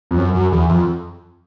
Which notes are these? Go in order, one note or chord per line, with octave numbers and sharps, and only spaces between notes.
F2
F#2
F#2
E2
F2